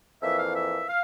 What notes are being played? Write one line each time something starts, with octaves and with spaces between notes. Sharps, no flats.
F2 E3 A#3 E5
F5
E5
F5